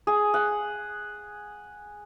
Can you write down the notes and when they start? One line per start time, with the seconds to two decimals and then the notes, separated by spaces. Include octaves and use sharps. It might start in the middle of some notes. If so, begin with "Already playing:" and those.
0.07 G#4
0.34 F#5